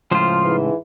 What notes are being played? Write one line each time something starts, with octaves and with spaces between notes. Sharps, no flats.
C#2 A2 F3 F4 C5
G#2 E3